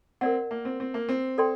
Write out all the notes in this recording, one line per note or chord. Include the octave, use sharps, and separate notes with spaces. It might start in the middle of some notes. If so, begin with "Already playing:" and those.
C4 A#4 D5 F#5
A#3
C4
C4
A#3
C4
A4 D5 G5 C6